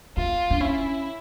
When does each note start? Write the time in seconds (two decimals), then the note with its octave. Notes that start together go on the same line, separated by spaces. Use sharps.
0.17 B3 F4
0.51 D4
0.60 C#4 E4